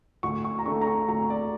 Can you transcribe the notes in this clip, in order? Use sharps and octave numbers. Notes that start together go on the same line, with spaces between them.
D2 C#6
C#6
A#5
D3 A3 C#6
A#5
C#6
D2 A#5
D5